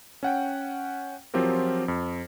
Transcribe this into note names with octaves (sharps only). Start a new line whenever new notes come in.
C#4 F#5 G5
F3 F#3 C4 F4 G4 A#4
F2